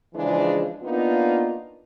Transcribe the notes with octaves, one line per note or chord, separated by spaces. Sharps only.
C#3 E3 F3 G#3 D4
A#3 B3 D4 D#4 F4